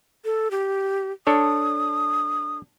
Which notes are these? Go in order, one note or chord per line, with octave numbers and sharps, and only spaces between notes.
A4
G4
D4 A4 C#5 D#6